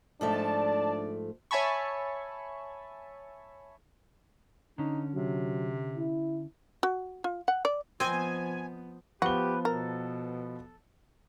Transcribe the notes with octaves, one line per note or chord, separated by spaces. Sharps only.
G#2 F3 A3 D4 D5 A5
C#5 E5 G#5 A5 B5 C#6
D3 C#4 D#4
C3 F#3
E4
F#4
F4
F#5
D5
F3 B3 C4 C5 D#5 G#5
F3 B3 F#4 G4 B4 G7
B2 A4 A#4